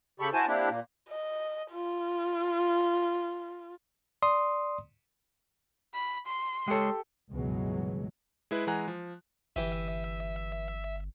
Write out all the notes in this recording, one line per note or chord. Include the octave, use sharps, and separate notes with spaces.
C#3 G4 A4 B5 C#6
E4 F#4 C5 G#5 A5
A#3 C4 D4 E4 G4
A#2 A#3
D#5
F4
D5 C6 D#6
B5
C6
G#3 G4 A4 C#5
C#2 G2 B2 E3 F#3 G#3
G#3 E4 B4
E3 G#3 F#5 G#5 A#5 F#6
F3
G1 E3 G4 E5 G#5